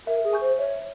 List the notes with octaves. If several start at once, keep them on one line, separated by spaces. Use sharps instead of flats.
A#4 E5
G#4
G#5 C#6 G6
C5
C#5 E5